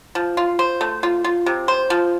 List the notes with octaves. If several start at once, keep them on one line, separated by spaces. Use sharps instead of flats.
F3
F4
C5
A3
F4
F4
C3
C5
F3